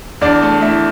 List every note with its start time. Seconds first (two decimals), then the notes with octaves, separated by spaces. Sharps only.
0.21 E2 D4 D5
0.42 A3
0.61 A3 E4 E5